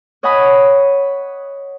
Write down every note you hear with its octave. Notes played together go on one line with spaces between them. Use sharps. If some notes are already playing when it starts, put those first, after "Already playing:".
C#5 D#5 F#5 G#5 B5 D#6